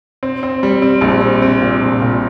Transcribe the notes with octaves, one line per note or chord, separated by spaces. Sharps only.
C4
C4
G3
C4
A#1
C4
C4
A#2
A#1
A#2